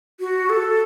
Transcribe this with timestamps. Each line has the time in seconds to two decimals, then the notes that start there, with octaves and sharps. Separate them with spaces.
0.20 F#4
0.49 A4